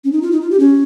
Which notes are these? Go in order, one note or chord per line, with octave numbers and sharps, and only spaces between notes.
C#4
D#4
F4
D#4
F4
G4
C#4